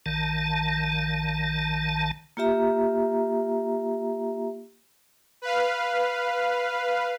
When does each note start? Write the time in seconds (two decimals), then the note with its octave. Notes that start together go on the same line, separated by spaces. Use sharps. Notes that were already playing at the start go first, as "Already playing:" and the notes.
0.06 A#1 D#3 A5
2.37 A#3 F4 G4 E5 A#5
5.42 B4 F5